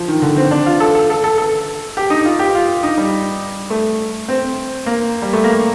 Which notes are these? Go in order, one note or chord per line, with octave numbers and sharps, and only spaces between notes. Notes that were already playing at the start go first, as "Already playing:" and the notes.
Already playing: F3
D#3
D3
C4
D4
F4
A4
A4
A4
A4
A4
G4
D#4
F4
G4
F4
D#4
G3
A3
C4
A#3
G3
A3
A#3